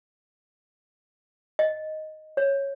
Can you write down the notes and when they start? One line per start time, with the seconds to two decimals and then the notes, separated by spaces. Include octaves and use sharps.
1.59 D#5
2.37 C#5